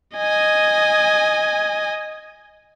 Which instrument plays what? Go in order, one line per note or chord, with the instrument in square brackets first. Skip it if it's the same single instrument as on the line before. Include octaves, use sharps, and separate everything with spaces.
[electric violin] D#5 G#5